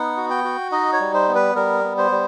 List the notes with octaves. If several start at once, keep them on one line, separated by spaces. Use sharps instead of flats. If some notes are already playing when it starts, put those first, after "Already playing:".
Already playing: B3 D#4 F#5
F#4
G5
F#4
D#4 D#5
C#5
G3
C5
B3
B4
G3 A#4
B3
C5
G3